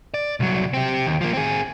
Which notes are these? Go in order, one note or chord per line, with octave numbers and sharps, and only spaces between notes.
D5
C2 F#3
C4 G4
D#2
F3 A#3
C4 G#4